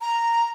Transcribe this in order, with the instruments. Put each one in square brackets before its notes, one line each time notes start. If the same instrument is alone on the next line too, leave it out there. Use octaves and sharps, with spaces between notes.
[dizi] A#5